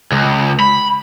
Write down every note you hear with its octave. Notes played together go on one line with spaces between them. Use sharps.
C#2
B5